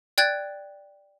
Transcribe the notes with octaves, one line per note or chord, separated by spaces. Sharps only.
D5 G5 F#6 G#6 A6